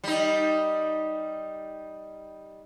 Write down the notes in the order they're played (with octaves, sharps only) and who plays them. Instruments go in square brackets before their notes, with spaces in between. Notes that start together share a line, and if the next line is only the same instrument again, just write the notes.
[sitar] G3 D#4